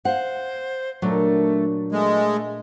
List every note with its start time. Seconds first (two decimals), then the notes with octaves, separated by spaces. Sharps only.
0.05 C5 F5 F#5
1.02 A#2 F#3 A3 D4
1.92 G#3 A3